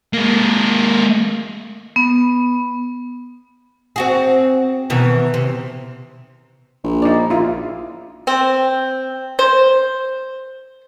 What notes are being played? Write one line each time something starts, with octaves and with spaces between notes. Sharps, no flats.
G#3 A#3
B3
C4 F#4 G#4
B2 D#3 E3
C3
A#1
D#4 D5
A#1 E4 F4
C4
C5